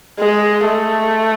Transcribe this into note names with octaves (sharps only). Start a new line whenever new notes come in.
G#3
A3